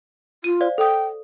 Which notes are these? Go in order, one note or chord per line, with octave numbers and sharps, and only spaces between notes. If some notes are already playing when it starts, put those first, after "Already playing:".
F4 D#7
C5 D5 F5
A4 G5 D#6